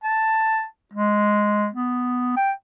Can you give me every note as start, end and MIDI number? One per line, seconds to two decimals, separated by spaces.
0.04 0.65 81
0.93 1.68 56
1.73 2.33 59
2.37 2.52 79